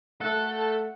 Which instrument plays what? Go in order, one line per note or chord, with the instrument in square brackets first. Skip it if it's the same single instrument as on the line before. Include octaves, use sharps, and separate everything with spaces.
[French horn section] A3 [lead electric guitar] A4 [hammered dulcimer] F#5